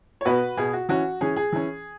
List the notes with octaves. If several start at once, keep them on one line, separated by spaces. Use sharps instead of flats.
C#5
B2 B3 F#4 B4
B2 B3 G#4
F#4
E3 C#4 F#4
E3 C#4 G#4
G#4
E3 C#4